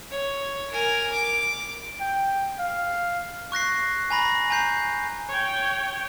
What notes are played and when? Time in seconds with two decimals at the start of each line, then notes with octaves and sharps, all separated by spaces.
0.11 C#5
0.72 A#4 G#5
1.13 D6
2.01 G5
2.59 F5
3.52 C#6 F#6 A#6 C7
4.10 G#5 A#5 B5 A#6
4.50 G#5 A#5 G6 C7
5.29 C#5 G5